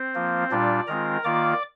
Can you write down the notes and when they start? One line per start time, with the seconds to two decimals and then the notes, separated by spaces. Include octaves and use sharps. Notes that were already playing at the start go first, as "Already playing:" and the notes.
Already playing: C4 C5
0.15 F3 A#3 F4
0.51 A#2 G3 D4 F4 D5
0.87 D#3 G#3 C4 F4 A#4 A#5
1.24 D#3 A#3 F4 D5 D6